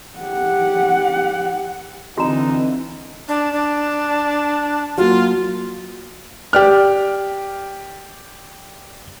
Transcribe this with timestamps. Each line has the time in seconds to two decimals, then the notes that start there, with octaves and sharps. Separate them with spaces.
0.19 G4 F#5
2.18 D3 E3 C4 D#4 F#4 A#5
3.28 D4
3.53 D4
4.98 F#3 A#3 F4
6.53 G4 D5 F6